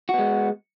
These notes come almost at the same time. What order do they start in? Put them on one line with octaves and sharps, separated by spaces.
F#4 B3 G#3